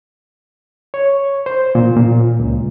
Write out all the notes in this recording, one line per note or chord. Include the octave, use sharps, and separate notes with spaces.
C#5
C5
A#2
A#2
C#2